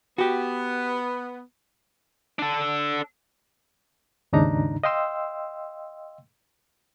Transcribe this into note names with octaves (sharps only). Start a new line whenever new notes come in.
B3 F#4 G4
D4 A4
D#2 G#2 C#3 D4 D#4 A#5
D#5 F5 G5 C6 E6